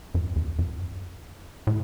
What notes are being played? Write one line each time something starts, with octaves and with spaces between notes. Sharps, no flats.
F#2
E2
F#2
A2